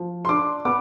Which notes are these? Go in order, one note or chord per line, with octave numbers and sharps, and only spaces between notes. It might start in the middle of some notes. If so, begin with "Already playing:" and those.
Already playing: F3
C6
D4 D6
B3 D6